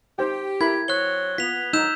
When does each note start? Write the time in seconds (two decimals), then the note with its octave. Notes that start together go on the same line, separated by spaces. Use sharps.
0.19 D#4 G4 C5 G5
0.61 E4 A#4 B5 G#6
0.88 F#3 C4 C#5 F#6 G7
1.38 B3 F4 B6 F7
1.73 D3 F3 F#3 D#4 E6 G6 E7